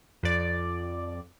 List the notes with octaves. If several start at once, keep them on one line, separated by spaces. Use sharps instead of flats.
F2 D5